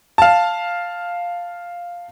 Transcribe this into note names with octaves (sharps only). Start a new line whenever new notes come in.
F5 A5